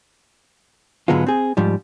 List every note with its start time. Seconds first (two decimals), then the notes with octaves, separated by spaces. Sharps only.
1.08 G#2 D3 F#3 G#3 B3 F4
1.27 C4 G#4
1.57 G#2 F3 G3